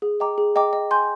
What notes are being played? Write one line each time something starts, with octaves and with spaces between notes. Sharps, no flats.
G#4
D#5 G5 A#5 D6
G#4
D#5 G5 A#5 D6
D#5
G#5 C6 G6